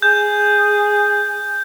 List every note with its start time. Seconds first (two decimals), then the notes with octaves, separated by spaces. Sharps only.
0.02 G#4 G6